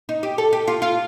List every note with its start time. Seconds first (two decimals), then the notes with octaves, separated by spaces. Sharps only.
0.09 D#4
0.23 G4
0.38 A4
0.53 G4
0.68 F4
0.82 F4